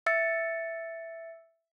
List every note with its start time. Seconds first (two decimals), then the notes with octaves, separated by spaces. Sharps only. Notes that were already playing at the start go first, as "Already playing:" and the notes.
0.06 E5 E6 A6 C#7